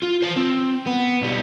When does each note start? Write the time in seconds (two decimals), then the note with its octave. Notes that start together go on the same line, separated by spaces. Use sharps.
0.02 F4
0.22 C5 A5
0.36 C4
0.87 B3
1.22 B1 G3